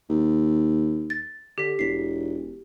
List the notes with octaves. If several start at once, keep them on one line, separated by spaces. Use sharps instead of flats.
D#2
A6
D3 G4 B6
E1 B6 C7